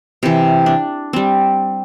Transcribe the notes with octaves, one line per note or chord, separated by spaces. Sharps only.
C3 E3
D4
G3 C4